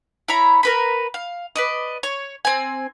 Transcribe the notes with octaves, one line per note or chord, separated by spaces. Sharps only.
E4 C#5 A#5 B5
A#4 B4 B5
F5
B4 D5 D#5
C#5
C4 G#5